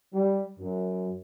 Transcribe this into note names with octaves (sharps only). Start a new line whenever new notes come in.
G3
F#2